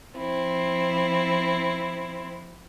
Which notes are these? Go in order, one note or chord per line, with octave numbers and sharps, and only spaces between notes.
F3 C4 E4